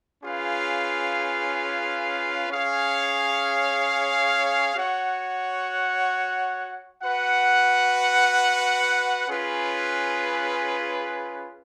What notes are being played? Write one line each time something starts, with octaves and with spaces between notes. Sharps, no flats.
C#4 F4 G#4 B4 F5
C#4 G#4 C#5 F5
F#4 C#5 F#5
F#4 B4 F#5
C#4 F4 G#4 B4